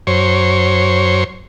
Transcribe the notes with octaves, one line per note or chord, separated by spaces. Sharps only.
F#2 C5 C#5